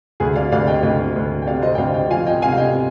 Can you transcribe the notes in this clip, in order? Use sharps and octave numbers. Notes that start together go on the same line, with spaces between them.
D2 G#4
D5 F5
D2 D5 F5
D#5 G5
D2 D#5 G5
D2
G5
C3 D5 F5
C5 D#5
G5
D2 D5 F5
D#5 G5
F3 F5 G#5
D#5 G5
C3 F5 G#5
F5
D#5 G5